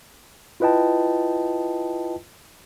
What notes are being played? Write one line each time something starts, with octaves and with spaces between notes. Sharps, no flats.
E4 F4 B4 D#5 G5 A5